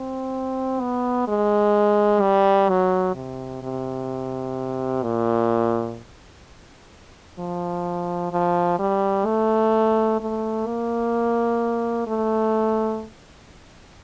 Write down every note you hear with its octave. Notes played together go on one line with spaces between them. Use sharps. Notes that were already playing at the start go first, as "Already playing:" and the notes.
Already playing: C4
B3
G#3
G3
F#3
C3
C3
A#2
F3
F3
G3
A3
A3
A#3
A3